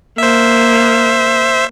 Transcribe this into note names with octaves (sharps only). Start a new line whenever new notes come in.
A#3 C5 E5